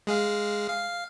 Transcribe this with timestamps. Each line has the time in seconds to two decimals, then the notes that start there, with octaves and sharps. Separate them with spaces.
0.07 G#3 G#4 F5
0.69 F5